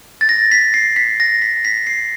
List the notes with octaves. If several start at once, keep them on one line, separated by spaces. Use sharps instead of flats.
A6
A#6
B6
C7
B6
A#6
B6
B6
C7